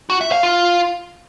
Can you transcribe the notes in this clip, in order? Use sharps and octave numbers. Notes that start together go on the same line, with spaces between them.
F#4
E5
F5
F4